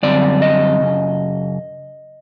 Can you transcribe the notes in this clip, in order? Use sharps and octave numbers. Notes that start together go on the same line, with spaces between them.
F#2 D3 G3 C4 D5
D#5
F#2 C#3